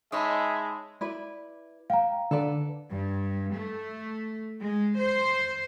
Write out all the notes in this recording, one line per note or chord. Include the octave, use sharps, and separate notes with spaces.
G#3 D#4 C#5 D#5 E5 A5 B5 D#6
E4 B4 D5
F5 G5 A#5
D3 A4 B4 D5
G2
A3
G#3
C5